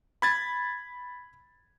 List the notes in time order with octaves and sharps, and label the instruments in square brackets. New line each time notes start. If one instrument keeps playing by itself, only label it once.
[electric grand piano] B5 G#6 A6